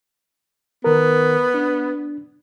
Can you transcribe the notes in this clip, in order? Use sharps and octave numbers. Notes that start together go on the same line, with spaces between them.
D#3 B3 A#4
D4